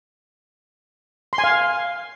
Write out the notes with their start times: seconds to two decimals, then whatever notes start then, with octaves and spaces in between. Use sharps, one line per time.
1.33 C6
1.38 G#5
1.44 F5